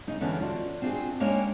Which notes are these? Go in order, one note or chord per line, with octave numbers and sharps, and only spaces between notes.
C#3 D#4
E2 D3 E3 B3 C#4 D4
F4 F#4 D5
C4 D4 F4 F#4 G#4
G#3 A#3 C#4 D4 C#5 G5